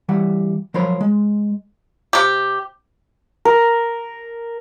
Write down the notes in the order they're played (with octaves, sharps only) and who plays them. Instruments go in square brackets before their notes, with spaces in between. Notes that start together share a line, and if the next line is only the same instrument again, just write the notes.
[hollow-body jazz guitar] E3 G3 F#5
F3 F#3 A#4 C5 C#5 B5
G#3
[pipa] C3 G4
[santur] A#4